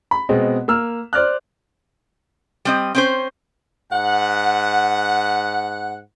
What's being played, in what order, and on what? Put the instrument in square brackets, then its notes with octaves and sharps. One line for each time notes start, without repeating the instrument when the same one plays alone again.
[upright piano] B5
B2 G#3 B3 C4
A#3 E6 F6
C5 D5 F6 F#6
[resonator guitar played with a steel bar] G3 C4 D#5
C4 C#4 C5
[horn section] G#2 F#5